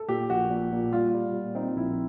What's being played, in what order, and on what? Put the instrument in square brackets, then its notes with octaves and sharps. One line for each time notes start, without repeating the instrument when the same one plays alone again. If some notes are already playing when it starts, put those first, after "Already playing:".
Already playing: [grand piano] A4
[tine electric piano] A#2 [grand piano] G4
[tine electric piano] A#1 [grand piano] F#4
[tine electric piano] A#2
A#2
[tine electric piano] G3 [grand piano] F4
[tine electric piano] G3
A#2
[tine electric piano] C4 [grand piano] D#4
[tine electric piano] A#1 [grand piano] E4